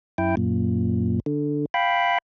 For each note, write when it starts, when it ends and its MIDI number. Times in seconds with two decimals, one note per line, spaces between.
0.18 0.35 42
0.18 0.35 64
0.18 0.35 79
0.37 1.20 42
0.37 1.20 46
1.26 1.66 50
1.74 2.18 77
1.74 2.18 79
1.74 2.18 83